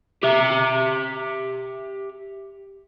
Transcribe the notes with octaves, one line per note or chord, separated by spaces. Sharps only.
G4 E5